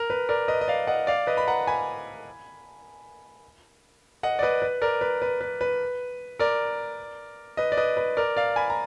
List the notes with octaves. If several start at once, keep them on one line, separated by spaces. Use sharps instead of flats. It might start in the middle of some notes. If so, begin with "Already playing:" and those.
Already playing: A#4
B4
A#4 D5
B4 D#5
D#5
D5 F5
D#5 F#5
D5 F5
B4 D#5
B5
F#5 A#5
G#5 B5
D#5 F#5
D5
B4 D#5
B4
A#4 D5
B4
B4
B4
B4
A#4 D5
B4 D#5
D5
B4 D#5
B4
A#4 D5
D5 F5
G#5 B5
A#5